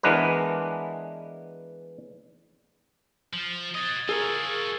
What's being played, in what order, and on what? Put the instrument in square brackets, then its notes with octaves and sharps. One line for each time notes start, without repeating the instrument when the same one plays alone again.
[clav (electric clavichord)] E3 G#3 B3 D4 A#4 B4
[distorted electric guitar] F3
[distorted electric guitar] F#4 D#5 [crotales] D#6 G#6 A6
[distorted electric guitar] F4 C#5 [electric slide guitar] G#4 A#4 [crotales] E6